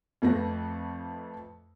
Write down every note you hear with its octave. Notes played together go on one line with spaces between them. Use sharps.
F2 F3 A3 A4 B4 A#6